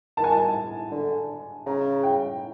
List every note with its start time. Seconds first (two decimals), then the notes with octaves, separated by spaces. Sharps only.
0.17 D#3 A5
0.24 G#5
0.32 A5
0.92 D3
1.66 C#3 A#5
2.03 G5